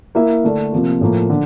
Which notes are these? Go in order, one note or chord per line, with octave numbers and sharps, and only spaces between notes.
A#3 E4 A#4 E5
D3 A3 D4 A4 D5
C3 F3 A#3 F4
A2 F3 A#3
D3 F3